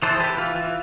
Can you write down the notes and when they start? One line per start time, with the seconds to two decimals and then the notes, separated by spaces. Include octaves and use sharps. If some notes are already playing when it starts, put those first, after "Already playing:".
0.02 E3 A4 C5
0.20 E3 G4 B4
0.37 E3 F4
0.55 E3